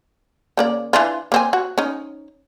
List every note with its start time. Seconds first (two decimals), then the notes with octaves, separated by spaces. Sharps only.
0.57 C#3 A#3 D5
0.93 E3 D4 F4
1.32 A#3 C4 G#5
1.53 F#4
1.78 C#4 D#4